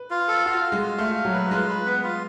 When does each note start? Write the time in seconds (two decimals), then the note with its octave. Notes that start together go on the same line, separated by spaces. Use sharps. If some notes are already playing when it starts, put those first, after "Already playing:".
Already playing: B4
0.11 F4
0.28 A4
0.46 F#4 F5
0.63 F4
0.72 G#3
0.81 F4
0.98 A3 F5
1.15 F5
1.25 F#3
1.33 B4
1.51 G#3 F4
1.69 B4
1.86 B3
2.03 F4